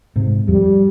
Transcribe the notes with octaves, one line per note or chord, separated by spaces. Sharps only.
G#2 C3
F2 G3